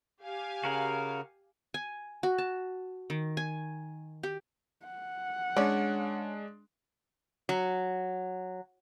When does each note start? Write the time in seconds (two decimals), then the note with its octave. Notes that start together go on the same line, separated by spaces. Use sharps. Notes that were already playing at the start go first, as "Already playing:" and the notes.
0.24 G4 F5 G#5
0.64 C#3 F#4 A#4 F#5
1.74 G#5
2.23 F#4
2.38 A5
3.10 D#3
3.37 G#5
4.23 G4
4.86 F#5
5.57 G#3 C#4 D4 D5
7.49 F#3